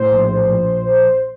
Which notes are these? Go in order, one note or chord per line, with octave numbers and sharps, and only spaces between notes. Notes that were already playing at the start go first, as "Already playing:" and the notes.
Already playing: A2 C5
A#1
A#1